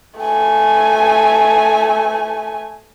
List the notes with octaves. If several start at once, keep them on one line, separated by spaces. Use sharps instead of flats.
A3 G#5